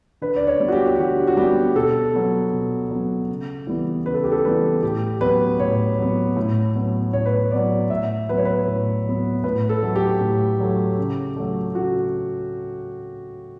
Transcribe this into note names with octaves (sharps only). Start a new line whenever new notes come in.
D3 B4
D5
C#5
G3 B3
F#4
G4
G4
D3 F#4
F#4
G3 B3 G4
B2 A4
F#3 B3
B2
F#3 B3
C#3
E3 G3 B3
C#3 B4
A4
G4
A4
E3 G3 B3 B4
A2 G4
F#3 B3 B4
A2 C#5
F#3 B3
A2
F#3 B3
A2 C#5
B4
C#5
F#3 B3 D5
A2 E5
F#3 B3 B4
C#5
B4
A2
F#3 B3
A2 B4
A4
F#3 A3
G4
A2
F#3 A3
C#3
F#3 A3
C#3 F#4